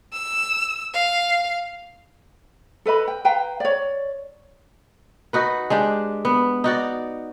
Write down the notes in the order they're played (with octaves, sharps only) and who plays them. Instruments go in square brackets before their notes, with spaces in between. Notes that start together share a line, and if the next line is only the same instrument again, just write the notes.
[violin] E6
F5
[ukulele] A4 B4 D#5 B5
G5
B4 F5 G5 A#5
C#5 D5
[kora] D#4 F#4 B4
G#3 D4 G4
B3
D#4 F#4 D5